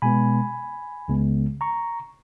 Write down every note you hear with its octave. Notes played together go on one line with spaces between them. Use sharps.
B2 G#3 B3 G#5 B5
C#2 C#3 G#3 B3
A#5 C#6